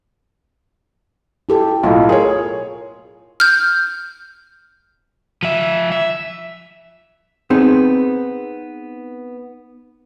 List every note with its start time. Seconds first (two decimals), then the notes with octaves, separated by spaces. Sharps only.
1.49 E4 G4 A4
1.83 B1 A2 F4
2.09 G#4 A#4 C#5
3.40 F6 G6
5.43 F3 E5
5.92 E5
7.50 B3 C4 D#4 G#4